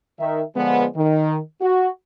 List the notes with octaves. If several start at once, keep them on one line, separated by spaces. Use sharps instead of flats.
D#3 E5
D3 F3 G#3 B3
D#3
F#4